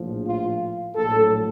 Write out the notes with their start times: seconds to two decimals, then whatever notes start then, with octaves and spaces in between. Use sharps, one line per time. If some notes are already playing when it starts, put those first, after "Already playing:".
Already playing: A#1 A2 F3
0.26 F4
0.95 A#1 A2 F#3 A4